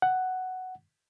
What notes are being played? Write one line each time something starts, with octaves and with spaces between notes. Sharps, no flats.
F#5